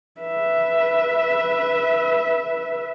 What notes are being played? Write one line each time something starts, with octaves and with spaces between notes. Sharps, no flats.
B4 E5